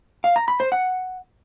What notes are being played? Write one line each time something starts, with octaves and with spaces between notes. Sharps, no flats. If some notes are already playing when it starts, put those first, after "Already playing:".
F5
A#5
B5
C5
F#5